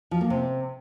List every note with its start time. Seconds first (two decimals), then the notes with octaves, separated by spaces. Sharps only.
0.11 F3
0.21 A#3
0.30 C3